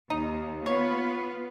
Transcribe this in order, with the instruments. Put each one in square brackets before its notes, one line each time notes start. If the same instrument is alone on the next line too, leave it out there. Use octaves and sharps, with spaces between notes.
[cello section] D#2 [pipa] D#4
[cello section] B3 F4 B4 [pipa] C#5